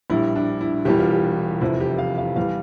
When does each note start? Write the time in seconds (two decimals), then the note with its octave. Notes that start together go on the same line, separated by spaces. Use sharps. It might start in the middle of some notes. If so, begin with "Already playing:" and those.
0.10 A#1 A2 G3 E4
0.35 D4
0.61 E4
0.85 E1 E2 E3 G3 G4
0.99 F4
1.10 G4
1.61 F1 E2 C3 F3 E4
1.80 G4
1.98 F5
2.18 F5
2.36 E2 E3 G3 F5